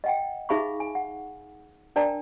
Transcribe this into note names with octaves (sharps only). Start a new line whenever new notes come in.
D#5 F#5 G5
D#4 G#4 E5 F5 B5 C#6
G#5
F#5
D4 A#4 D5 G5 A5 A#5